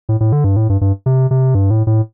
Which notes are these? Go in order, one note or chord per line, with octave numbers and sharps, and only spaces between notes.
A2
A2
D3
G2
A2
G2
G2
C3
C3
G2
A2
A2